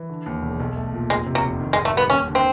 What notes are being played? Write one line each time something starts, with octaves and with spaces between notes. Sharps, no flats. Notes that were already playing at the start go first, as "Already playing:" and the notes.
Already playing: E3
D3
D#2
E1
B1
A3
A#2
F1 G#3
C3
F#3
F1
D#3
G#3
G#1
A3
G3 B3
D#2 C#4
D3
C4